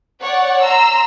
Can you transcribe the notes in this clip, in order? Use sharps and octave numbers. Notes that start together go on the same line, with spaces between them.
C#5 D5 F#5
A#5 C6 E6